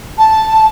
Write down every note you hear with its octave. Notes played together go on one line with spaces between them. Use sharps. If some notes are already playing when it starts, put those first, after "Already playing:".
A5